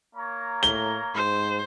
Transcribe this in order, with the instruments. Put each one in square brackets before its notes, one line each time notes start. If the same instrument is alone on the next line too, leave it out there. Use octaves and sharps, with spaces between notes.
[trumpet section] A#3 C#5 A#5
[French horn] A2 [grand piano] G7
[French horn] G#2 [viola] C5